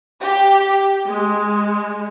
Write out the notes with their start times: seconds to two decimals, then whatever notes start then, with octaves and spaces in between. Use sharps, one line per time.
0.21 G4
1.06 G#3